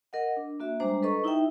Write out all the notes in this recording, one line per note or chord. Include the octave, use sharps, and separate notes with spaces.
A#4 D#5 F#5
D4
A#3 F#4 E5
G3 G#3 D4 C5 A#5
A4 B4 D#5 A#5 C#6
D#4 E4 G4 E5 G5